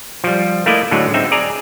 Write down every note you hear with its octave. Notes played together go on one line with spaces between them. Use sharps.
F3 G3
A3 A#3 E4 D5 D#5
A2 D3 F#3 G#3
C4 D#4 E5
G#4 D5 G#5 A#5